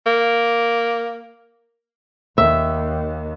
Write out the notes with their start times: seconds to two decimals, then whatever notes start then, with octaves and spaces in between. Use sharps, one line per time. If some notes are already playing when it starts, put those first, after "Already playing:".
0.06 A#3
2.38 D#2 E5